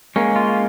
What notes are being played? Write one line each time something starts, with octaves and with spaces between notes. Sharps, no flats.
G#3 A#3 C#4
F4